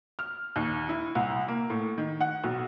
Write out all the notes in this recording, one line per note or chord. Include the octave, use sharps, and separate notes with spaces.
F6
D#2
E4
C2
A#3
A2
D#3
F#5
B1